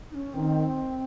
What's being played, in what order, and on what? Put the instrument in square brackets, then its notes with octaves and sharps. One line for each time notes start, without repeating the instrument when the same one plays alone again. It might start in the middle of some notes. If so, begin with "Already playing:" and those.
[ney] D#4
C#4
[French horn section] D#3 [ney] C4